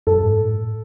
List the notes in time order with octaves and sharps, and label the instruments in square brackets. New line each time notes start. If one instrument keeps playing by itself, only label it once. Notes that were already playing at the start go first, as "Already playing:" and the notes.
[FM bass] F#2 [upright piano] A4
[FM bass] G#2
A2